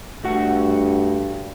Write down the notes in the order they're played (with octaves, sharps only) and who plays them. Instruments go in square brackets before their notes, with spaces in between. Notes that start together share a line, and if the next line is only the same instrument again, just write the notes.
[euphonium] G2 [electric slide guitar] A3 F#4 F#5